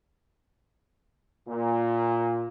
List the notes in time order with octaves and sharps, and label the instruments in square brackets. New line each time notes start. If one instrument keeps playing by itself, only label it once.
[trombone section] A#2